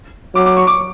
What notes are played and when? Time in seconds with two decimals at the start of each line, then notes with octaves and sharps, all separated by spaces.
0.35 F#3 D6
0.46 D6
0.57 C#6
0.67 D6